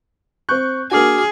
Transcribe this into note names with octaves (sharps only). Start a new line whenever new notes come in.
C4 C#6 F#6 G6
A#3 D4 F#4 G#4 D6 F6